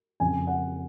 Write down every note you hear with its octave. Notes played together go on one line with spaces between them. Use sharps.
F2 C#3 G#5
F#5